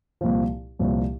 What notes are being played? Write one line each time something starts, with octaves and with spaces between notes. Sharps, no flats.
C2 A#2 F3
C2 A#2 F3